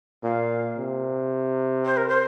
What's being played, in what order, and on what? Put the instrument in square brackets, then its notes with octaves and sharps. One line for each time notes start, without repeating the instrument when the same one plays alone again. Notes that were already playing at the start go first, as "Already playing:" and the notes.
[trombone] A#2 [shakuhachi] F5
[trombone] C3
[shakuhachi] C5
A#4
C5